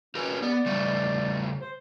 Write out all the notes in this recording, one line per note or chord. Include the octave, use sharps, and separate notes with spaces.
C#4 G4 A#4 B4
B3 D5
C#3 G3 A3
C5